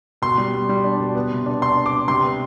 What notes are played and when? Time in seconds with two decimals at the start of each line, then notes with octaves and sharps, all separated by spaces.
0.22 B2 C6
0.38 G3
0.54 G3
0.69 G3
0.84 D4
1.00 B2
1.15 B3
1.31 C3
1.46 D4
1.62 D4 C6
1.77 D4
1.86 D6
1.94 D4
2.08 C3 C6
2.24 B3